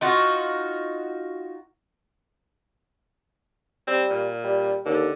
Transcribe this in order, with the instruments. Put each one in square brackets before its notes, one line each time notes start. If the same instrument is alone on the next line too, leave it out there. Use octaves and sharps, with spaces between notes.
[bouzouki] D#4 F4 F#4
[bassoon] G3 [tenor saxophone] C4
[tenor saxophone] A#2
[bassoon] G3
[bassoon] D#2 [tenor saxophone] D3